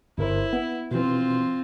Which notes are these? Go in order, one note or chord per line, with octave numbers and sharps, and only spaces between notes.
G1 E4 A#4 C5
B3
B2 E3 C4 F4